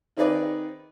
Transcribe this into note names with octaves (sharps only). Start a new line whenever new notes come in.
D#3 C4 D#4 G#4 B4 D5